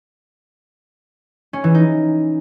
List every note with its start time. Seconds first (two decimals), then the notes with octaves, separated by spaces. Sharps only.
1.53 C#4
1.64 E3
1.74 D#4